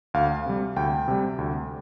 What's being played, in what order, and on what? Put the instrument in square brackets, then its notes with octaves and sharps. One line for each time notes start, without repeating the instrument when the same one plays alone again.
[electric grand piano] D2 F5
C3 G3
D2 G5
C3 G3
D2